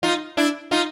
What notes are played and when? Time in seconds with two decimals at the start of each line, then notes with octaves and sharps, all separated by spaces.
0.03 D#4 F4
0.37 D4 E4
0.71 D#4 F4